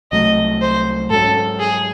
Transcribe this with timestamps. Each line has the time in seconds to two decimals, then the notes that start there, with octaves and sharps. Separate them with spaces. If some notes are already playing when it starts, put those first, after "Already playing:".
0.12 C2 C3 F#3 A3 D#5
0.61 C5
1.10 G#2 F#3 C#4 A4
1.60 G#4